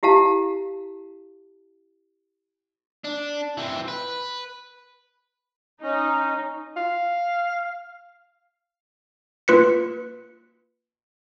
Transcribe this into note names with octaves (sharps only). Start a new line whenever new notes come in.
E4 G4 F5 A5
D4
E3 C4
B4
C#4 D#4
F5
A#3 F4 B4 B6 C#7